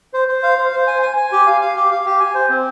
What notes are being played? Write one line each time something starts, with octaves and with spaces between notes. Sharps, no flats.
C5
C5
F5
C5
C5
G#5
G#5
G#5
G4
F5
F5
G4
F5
G4
G#5
C5
C4